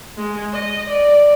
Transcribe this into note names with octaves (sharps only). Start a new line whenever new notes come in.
G#3
D#5
D5